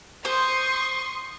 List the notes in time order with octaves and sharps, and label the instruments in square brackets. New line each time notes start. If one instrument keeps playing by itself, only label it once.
[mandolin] C5 [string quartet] C6 C#6 D#6